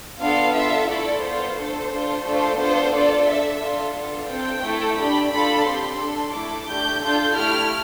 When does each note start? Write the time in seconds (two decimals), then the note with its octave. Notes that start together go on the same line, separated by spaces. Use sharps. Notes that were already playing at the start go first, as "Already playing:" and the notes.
0.21 B3 D4 F4 A4 F5
0.54 D4 F4 A4 E5
0.88 A3 E4 A4 D5
1.22 B3 F4 A4 C5
1.56 A3 D4 A4
1.90 D4 F4 A4
2.25 A3 D4 F4 A4 C5
2.59 B3 D4 F4 A4 C5
2.93 D4 F4 A4 D5
3.26 D4 A4 E5
3.61 D4 F4 A4
3.95 B3 D4 F4 A4
4.29 C4 F4 A4 G5
4.63 A3 E4 A4
4.97 D4 G4 B5
5.31 D4 F4 A4 B5
5.65 C4 G4 C6
5.99 D4 A4
6.33 A3 E4 A4 D6
6.67 A3 D4 G4 G6
7.01 D4 F4 A4 G6
7.35 A3 E4 G4 F6